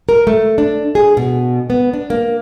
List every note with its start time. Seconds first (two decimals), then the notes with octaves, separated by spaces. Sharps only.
0.09 A#4
0.27 A3
0.58 D4
0.95 G#4
1.17 B2
1.70 B3
1.93 D4
2.10 A#3